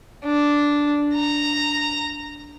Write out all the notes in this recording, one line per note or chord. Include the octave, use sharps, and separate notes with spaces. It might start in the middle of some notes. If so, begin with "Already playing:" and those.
D4
A#5